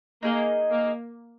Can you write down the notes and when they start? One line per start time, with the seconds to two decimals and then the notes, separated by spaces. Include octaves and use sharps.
0.23 A#3 D#4 G#4 B4 D#5
0.71 A#3